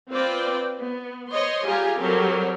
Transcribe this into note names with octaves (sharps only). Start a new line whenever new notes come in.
C4 F4 B4 C5 D5 G5
B3
C5 C#5 D#5 C6
G3 F4 G4 G#4 G#5 A#5
F#3 G3 C4 G4 A4 A#4